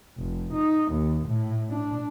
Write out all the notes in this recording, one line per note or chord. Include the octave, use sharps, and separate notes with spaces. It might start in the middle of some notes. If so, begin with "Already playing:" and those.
F1
D#4
D#2
A2
D4